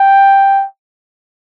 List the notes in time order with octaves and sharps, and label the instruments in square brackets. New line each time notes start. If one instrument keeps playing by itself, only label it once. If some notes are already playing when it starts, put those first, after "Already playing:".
Already playing: [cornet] G5